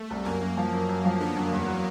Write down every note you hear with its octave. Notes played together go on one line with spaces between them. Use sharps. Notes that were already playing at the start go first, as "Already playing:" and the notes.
Already playing: A3
C2
F#2 A#3
F#2
F3
F#2
F#2
F3
D3 B3
F#2
E2
F#3